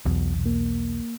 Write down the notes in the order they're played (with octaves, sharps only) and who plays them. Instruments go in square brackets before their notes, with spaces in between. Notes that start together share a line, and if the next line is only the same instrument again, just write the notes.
[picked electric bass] B1 E2 [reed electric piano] B2
[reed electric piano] A#3